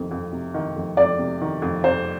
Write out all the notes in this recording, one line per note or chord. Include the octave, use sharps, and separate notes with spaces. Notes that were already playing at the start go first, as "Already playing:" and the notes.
Already playing: F2 C3 D#3
F2
C3
D#3
F2
F2 D5
C3
D#3
F2
F2 C5